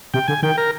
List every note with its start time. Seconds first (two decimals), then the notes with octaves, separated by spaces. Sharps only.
0.14 C3 G5
0.28 D3 G#5
0.43 D#3 G5
0.58 A#4